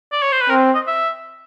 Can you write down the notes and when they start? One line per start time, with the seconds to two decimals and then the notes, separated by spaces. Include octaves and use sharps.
0.12 D5
0.22 C#5
0.32 C5
0.41 B4
0.49 C4 A#4
0.75 D#5
0.87 E5